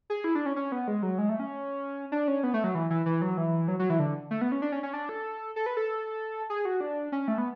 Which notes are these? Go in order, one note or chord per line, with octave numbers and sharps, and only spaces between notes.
G#4
E4
D4
C#4
C#4
B3
G#3
F#3
G#3
A3
C#4
D4
C#4
B3
A3
F#3
E3
E3
E3
F#3
E3
F#3
F#3
E3
D3
A3
B3
C#4
D4
C#4
C#4
D4
A4
A4
B4
A4
G#4
F#4
D4
C#4
A3
B3